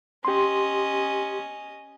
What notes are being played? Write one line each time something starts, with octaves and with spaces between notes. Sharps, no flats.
C#4 G4 D#5 C6